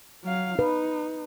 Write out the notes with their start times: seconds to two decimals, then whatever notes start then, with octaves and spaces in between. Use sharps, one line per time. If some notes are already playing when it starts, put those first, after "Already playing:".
0.24 F#3 F5
0.59 D#4 B4